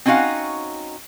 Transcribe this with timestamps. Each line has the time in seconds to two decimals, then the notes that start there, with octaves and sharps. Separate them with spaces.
0.06 C4 C#4 D#4 F#4 F5 F#5